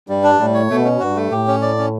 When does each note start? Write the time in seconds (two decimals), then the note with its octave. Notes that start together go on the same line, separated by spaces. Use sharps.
0.08 G2 G3
0.23 D4
0.39 A2 G3
0.54 C#5
0.70 B2 A3
0.85 C#4
1.00 G2 F#4
1.16 A3
1.31 A2 G4
1.48 C#4
1.62 D5
1.78 C#4